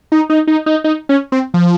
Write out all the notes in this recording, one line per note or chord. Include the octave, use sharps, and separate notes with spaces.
D#4
D#4
D#4
D#4
D#4
C#4
C4
F3